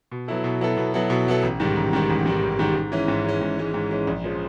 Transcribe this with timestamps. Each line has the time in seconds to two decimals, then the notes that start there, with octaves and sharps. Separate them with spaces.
0.12 B2
0.28 F#3 B3 E4 A4
0.44 B2
0.61 F#3 B3 E4 A4
0.77 B2
0.94 F#3 B3 E4 A4
1.10 B2
1.27 F#3 B3 E4 A4
1.43 A1
1.60 G#2 D#3 G3
1.76 A1
1.93 G#2 D#3 G3
2.10 A1
2.26 G#2 D#3 G3
2.43 A1
2.59 G#2 D#3 G3
2.75 G#2
2.92 E3 G#3 C#4
3.08 G#2
3.24 E3 G#3 C#4
3.41 G#2
3.58 E3 G#3 C#4
3.74 G#2
3.91 E3 G#3 C#4
4.07 A#1
4.24 F3 G#3 C#4